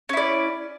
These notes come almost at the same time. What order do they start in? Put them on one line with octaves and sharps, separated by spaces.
C#4 E4 D5